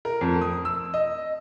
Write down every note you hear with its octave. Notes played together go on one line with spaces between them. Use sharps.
A#4
F2
D#6
E6
D#5